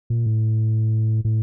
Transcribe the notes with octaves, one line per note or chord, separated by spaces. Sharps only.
A#2
A2
A2